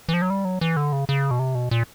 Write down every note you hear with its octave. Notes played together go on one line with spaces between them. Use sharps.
E3
F3
F#3
G3
F#3
E3
D3
C#3
C#3
B2
C3
B2
A#2